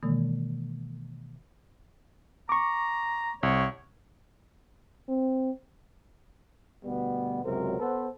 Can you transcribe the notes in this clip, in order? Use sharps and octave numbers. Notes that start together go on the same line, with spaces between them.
B2 D#3 E3 G#3 A#3
A#5 C#6 D6
C2 C#5
C4
D2 B2 G3 B3
C#2 F#2 C3 F#3 A#4 C5
B3 A4 B4 C5